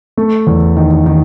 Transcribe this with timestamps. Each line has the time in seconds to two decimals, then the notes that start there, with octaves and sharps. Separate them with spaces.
0.17 A3
0.47 E2
0.77 D#3
1.06 D#3